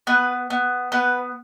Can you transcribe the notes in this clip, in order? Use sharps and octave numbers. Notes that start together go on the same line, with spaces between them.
B3 B4
B3
B3 B4